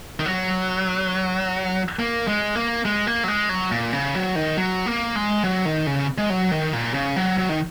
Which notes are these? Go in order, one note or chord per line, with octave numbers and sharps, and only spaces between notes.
D#3
F#3
A#3
G#3
A#3
G#3
A#3
F#3
G#3
F#3
A#2
C#3
F#3
D#3
F#3
A#3
G#3
F#3
D#3
C#3
G#3
F#3
D#3
A#2
C#3
F#3
F#3
D#3